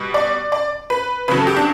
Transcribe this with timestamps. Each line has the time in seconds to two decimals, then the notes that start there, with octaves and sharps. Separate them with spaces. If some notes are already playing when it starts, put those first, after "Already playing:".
Already playing: B2 G3
0.14 D5
0.52 D5
0.90 B4
1.28 C#3 F#3 B4
1.37 A4
1.47 G4
1.57 D4